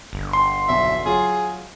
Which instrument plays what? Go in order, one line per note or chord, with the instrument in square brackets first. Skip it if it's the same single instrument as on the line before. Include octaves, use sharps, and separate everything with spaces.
[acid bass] G1
[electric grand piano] C6
[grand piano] B1 E2 [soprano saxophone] E5
[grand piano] F#3 F4 [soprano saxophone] G#4